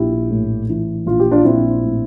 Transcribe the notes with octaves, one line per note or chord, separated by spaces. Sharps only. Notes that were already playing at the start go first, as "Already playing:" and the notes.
Already playing: A#1 E4 G4
A2
E3
A#1 F4
G4
D4 F4
A#1 C4 E4
A2